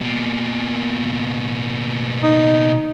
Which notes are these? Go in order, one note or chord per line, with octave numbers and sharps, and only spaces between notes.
B2 A#3
D#4